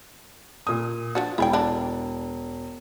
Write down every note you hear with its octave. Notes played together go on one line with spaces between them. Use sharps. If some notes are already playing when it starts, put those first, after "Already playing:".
A#2 D#6
F3 D4 F#4
E1 E4 G#4 G5
D3 E3 D4